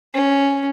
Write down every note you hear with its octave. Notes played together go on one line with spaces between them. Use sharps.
C#4